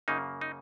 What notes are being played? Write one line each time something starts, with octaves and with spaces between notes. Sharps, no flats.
F#2 C#3 F#3 A#3 D#4
D#4